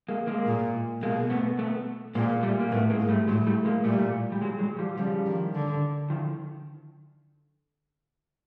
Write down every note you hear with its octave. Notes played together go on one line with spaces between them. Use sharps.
G#3 A#3
G#3 A#3
A#2
B2 G#3 A#3
A3 B3
A3 B3
A#2 G#3 A#3
G3 A3
A#3
A2 A3 B3
G#3 A#3
G#2
G3 A3
A2 F#3 G#3
G3 A3
G#3 A#3
A#2 G3 A3
G3
F#3 G#3
F#3 G#3
F3 G3
C#3 F3 G3
D#3
D3
D#3 F3